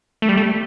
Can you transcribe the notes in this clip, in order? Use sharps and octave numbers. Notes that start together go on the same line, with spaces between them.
A3
G3
A3